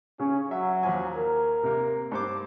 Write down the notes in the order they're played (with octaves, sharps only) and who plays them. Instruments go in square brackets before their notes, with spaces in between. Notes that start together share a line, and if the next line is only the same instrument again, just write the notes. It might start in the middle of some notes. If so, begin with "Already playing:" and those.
[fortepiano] C#3 [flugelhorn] C#4
[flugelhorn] F#3 [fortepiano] E5
[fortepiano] D#2 F3 G#5
[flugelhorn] A#4
[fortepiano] C3 A#3
G2 C5 D6